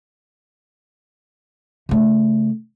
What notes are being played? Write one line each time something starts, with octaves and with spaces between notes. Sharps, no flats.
C#3 A3